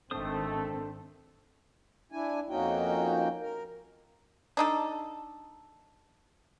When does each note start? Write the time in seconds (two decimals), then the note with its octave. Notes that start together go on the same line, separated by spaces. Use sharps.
0.11 G#1 D#3 A3 C4 D4 A4 C5 D#6
2.12 D4 E4 G#5
2.49 F2 A#3 C#4 D#4 F#4 G5
3.40 A#4
4.57 D4 D#4 A4